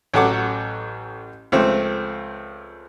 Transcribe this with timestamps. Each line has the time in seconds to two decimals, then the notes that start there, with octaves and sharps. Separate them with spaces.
0.14 A1 F#3 A4 F#5 D6
1.52 C#2 F3 A3 C4